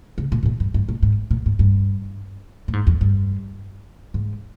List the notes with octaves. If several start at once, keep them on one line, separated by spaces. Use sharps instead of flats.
C#3
A#2
G#2
A#2
G2
G2
A#2
G#2
A#2
G#2
G2
A#2
G#2
F2
G2
G#2